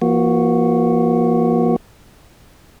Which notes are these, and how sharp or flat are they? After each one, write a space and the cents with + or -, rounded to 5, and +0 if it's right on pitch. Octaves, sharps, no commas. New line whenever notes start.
F3 -40 A#3 +25 F#4 +0